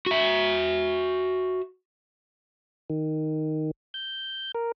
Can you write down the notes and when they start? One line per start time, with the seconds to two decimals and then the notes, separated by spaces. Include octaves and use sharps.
0.06 F#4 E5
2.90 D#3
3.94 G6
4.55 A#4